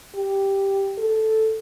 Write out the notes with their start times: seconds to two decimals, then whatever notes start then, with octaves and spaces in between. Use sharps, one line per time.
0.16 G4
0.98 A4